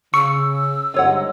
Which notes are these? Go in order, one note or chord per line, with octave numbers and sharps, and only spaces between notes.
C#3 C#6 E6
G1 G#2 F4 C#5 D#5 F#5